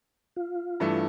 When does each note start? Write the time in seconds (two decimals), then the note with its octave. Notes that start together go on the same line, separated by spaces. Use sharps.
0.36 F4
0.80 G2 E3 A3